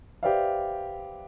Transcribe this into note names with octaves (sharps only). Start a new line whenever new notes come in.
G4 B4 C5 D5 E5 F5